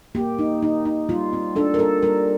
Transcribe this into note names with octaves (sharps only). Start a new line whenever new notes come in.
A#3 G4
D#4
D#4
D#4
G3 F4
C4
D4 A4
A#4
G3 A4
G3 A#4